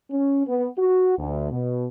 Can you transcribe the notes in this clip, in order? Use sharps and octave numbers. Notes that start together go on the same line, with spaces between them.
C#4
B3
F#4
D2
B2